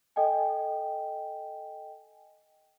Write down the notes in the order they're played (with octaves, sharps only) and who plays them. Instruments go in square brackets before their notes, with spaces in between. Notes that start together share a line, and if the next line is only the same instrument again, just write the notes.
[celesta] A4 D#5 G5 G#5